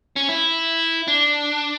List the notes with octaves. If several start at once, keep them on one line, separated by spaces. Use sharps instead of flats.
C#4
E4
D4